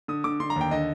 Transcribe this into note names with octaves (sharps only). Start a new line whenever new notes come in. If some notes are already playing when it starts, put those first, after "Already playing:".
D3 D#6
D3 D6
D3 C6
A#5
D#2 G5
D3 D#5